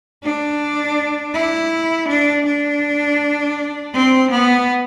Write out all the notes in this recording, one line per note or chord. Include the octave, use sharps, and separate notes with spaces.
D4
E4
D4
D4
C4
B3